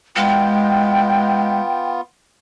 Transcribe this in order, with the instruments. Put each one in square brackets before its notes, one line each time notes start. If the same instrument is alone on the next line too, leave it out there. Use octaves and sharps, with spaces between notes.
[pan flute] G#3 [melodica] B3 F4 [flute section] G5